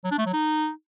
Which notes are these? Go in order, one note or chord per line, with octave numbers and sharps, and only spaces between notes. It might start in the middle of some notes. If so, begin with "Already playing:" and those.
F#3
D4
A3
F#3
D#4